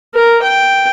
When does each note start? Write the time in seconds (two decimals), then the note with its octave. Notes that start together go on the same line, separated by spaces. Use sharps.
0.14 A#4
0.43 G5